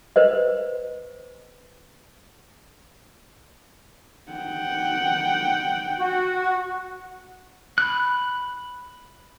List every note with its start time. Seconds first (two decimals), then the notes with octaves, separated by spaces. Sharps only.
0.16 B4 C5 D#5
4.32 F#5 G5
5.98 F#4
7.78 B5 F#6